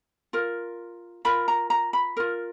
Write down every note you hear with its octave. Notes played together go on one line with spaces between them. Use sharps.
F4 A#4
F4 A#4 B5
A#5
A#5
B5
F4 A#4